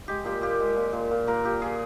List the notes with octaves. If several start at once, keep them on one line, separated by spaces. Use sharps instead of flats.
G#3 G4
A#2 G4
A#2 G4
G#3
A#2
A#2
A#2
A#2 A#4
A#2 G4
A#2 G#4